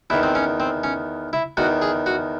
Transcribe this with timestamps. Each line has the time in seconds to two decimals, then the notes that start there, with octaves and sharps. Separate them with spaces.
0.10 E2 D#3 E4
0.23 C4
0.35 C#4
0.60 C4
0.84 C#4
1.33 E4
1.57 E2 D#3 F#4
1.82 G#4
2.06 F#4